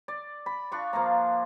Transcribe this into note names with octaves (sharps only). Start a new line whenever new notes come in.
D5
B5
D4 F4 C#6
F3 A#3 F5 A#5